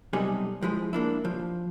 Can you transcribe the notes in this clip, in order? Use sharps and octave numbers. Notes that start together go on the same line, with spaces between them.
B1 C3 G3 D#4 A4 G#5
F3 G#3 E4 G#4
A#3 D4 E4
F3